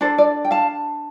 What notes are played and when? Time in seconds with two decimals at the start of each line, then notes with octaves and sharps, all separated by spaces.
0.01 D4 A4 C5
0.18 D5
0.45 G5
0.51 F5 A5